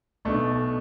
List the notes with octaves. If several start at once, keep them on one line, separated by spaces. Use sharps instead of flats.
B1 B2 A3 D4